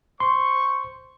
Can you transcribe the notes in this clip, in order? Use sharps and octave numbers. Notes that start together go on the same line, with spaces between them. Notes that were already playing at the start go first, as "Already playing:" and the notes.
C5 C6 C#6